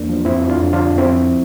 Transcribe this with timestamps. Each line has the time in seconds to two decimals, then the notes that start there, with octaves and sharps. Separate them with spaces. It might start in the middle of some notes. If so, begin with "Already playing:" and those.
Already playing: E2 A#3 D4
0.09 F3
0.25 F2 C4 E4
0.41 F3
0.49 D4 F4
0.57 F2
0.73 D3 D4 F4
0.90 F2
0.98 C4 E4
1.05 F3